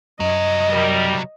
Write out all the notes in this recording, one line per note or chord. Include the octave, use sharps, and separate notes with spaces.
C2 F#2 F#3 D#5
G3 A#4